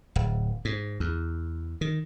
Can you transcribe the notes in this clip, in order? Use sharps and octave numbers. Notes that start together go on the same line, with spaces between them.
D1
G#2
E2
D#3